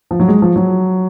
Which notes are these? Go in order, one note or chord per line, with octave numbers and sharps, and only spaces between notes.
F3
F#3
G#3
F3
F#3